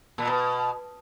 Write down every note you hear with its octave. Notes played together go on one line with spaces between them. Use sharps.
A#2
B2